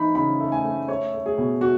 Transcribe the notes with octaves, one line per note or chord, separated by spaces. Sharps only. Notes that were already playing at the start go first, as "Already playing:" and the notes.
Already playing: E3 D#4 B5
C#3 B5
A3
G#5
A3
A3 C#5
A3
G#4
B2
A3 F#4